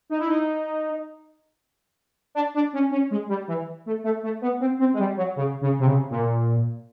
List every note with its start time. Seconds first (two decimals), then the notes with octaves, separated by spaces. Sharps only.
0.10 D#4
0.19 E4
0.28 D#4
2.35 D4
2.54 D4
2.73 C#4
2.91 C#4
3.11 G#3
3.29 G3
3.48 E3
3.86 A3
4.04 A3
4.23 A3
4.41 B3
4.60 C4
4.79 C4
4.94 G#3
4.99 G3
5.17 F#3
5.36 C#3
5.61 C#3
5.80 C3
5.86 C#3
6.10 A#2